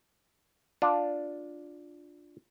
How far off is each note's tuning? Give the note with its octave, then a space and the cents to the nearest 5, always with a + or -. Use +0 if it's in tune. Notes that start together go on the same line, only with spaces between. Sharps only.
D4 +0 F4 +10